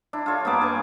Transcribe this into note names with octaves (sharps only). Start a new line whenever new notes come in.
D4 E4
F4 A4 C#5
G2 A#3 B3 D6
G2 G#5 C#6